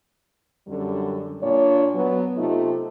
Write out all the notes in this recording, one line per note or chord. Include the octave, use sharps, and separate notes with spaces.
F#2 D3 G3
A#2 D4 C#5
F#3 B3
C3 A3 D#4 F4